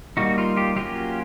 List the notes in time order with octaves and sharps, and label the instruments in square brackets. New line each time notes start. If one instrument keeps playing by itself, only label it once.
[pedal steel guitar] G3 A#3 D#4 F#4
F4
F4 G4
F#3 A#3 C#4 F4 G4